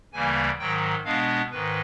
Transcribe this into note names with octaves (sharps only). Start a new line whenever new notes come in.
D2 C#3 E3 G3 A#3 G#5
G#2 D#3 F#3 G5
B2 G#3 B3 D4 F5
G#2 D#3 B4